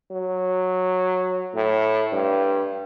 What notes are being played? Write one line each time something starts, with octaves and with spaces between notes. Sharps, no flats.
F#3
A2
G2